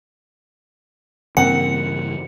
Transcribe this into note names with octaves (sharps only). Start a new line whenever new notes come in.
G2 C#3 E3 A#3 C4 F#5 C#7